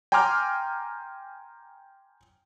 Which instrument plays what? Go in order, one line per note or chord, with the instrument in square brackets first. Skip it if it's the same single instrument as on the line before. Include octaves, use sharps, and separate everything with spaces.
[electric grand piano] G5 G#5 A#5 C6 D6 F6